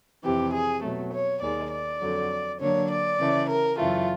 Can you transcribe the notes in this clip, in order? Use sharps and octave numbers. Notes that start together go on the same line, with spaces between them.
F2 C3 E3 G4
G#4
B2 F#3 A3
C#5
D#2 D#3 G#3 D5
D5
F2 D3 F#3
D3 F#3 A#3 D4 C#5
D5
C#3 E3 A3
A#4
F#2 C#3 E3 A3 F4